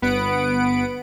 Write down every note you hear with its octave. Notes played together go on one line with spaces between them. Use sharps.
G1 B3 B4 F#5 D7